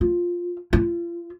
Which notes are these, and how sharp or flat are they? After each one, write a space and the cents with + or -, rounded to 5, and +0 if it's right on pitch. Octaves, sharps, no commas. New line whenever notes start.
F4 +5
F4 -35